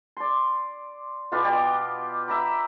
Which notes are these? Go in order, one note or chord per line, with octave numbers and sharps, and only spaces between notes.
D5 C6
B2 B3 F4 G4
G4 D5 D#5
E5 A#5 B5